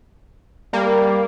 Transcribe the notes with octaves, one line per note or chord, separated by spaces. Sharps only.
G3 A#3